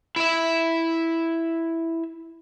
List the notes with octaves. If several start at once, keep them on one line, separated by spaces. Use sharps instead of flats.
E4 E5